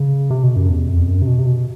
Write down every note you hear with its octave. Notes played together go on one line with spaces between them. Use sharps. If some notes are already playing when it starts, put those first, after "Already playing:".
Already playing: C#3
C3
B2
F#2
E2
F2
F#2
C3
B2
C3
B2